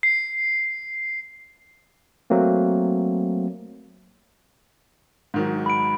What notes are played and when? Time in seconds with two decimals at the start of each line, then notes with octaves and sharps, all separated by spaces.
0.03 C7
2.30 F#3 A3 A#3 C4
5.34 G#2 D#3 F#3
5.66 B5 D7